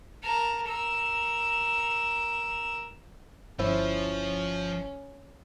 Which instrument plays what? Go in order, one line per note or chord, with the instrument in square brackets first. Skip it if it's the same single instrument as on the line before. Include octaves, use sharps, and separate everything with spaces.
[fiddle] A#4 A5
A#4 E6
[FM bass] G1 [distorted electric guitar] F3 F4 [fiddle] C#4 [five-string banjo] E4 C5